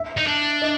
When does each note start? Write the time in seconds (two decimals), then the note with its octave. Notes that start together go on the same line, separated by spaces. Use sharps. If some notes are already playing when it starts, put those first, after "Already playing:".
Already playing: E5
0.17 D#4
0.27 D4
0.62 D#5